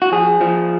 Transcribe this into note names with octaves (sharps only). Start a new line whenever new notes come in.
F#4
F3 G#4
F3